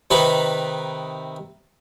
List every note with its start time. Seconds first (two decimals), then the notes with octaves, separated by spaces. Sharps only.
0.11 C3 D#3 D#4 B4